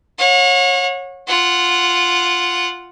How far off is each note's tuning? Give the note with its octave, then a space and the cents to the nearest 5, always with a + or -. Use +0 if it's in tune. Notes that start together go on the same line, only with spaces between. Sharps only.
C#5 -20 F#5 -40
F4 +0 F#5 +0